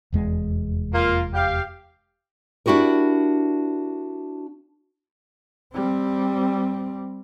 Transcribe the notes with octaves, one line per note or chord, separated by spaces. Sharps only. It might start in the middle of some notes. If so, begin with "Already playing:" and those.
F1 E2 G#3
A#3 F4
G4 F5
D4 E4 F#4 G4 A#4
G3 C4